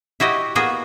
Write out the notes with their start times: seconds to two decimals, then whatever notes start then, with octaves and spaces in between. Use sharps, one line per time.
0.20 E4 F#4 G4 D#5
0.55 A#3 B3 F#4 G#4